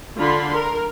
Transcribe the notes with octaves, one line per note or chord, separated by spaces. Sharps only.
D3 F4 B5 C6
A#4